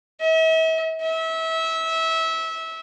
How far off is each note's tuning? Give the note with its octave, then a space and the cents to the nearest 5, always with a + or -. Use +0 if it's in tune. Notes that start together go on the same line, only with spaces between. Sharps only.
E5 -40
E5 -25